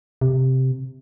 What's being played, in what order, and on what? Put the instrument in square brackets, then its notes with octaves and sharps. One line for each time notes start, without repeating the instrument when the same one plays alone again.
[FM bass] C3